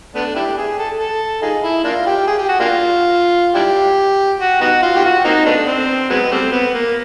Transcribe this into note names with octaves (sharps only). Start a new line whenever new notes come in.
A3 B3 D4
D4 E4 G4
G#4
A4
A4
D#4 F4 G#4
E4
A#3 D4 F4
G4
G#4
G4
F#4
A#3 D4 F4
D4 E4 G4
F#4
B3 D#4 F#4
F4
G4
F#4
A#3 C4 D#4
A3 B3 D4
C4
F#3 G#3 B3
G3 A3 C4
B3
A#3